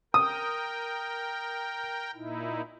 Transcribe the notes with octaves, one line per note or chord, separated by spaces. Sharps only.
A#4 G5 D#6
A#2 D#4 E4